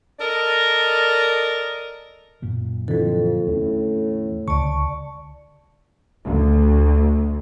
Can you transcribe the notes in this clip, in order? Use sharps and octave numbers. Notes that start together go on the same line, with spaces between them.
A4 A#4 D5 D#5
F#2 A#2 F#3
F2 D3 E3 A4
E2 A2 C4 C#4
C#2 D3 D5 A5 C#6
D2